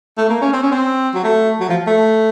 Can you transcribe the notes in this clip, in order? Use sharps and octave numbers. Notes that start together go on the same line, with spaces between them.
A3
A#3
C#4
C4
C#4
C4
F#3
A3
F#3
F3
A3